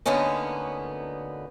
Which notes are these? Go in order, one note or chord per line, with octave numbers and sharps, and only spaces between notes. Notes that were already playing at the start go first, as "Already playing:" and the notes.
D2 D3 A#3 B3 C#4 D#4